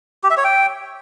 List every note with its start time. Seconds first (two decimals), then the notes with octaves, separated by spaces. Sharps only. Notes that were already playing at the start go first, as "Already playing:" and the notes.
0.24 G4
0.31 E5
0.37 C#5
0.44 G5